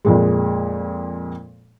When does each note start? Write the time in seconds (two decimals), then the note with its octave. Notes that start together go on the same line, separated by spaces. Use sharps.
0.05 F2 A#2 G#3